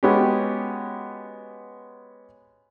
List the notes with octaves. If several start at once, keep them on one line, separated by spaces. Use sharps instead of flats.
G#3 B3 C#4 F#4 G4